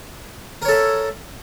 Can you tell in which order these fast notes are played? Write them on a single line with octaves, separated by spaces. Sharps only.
A#4 C#5 A4 E5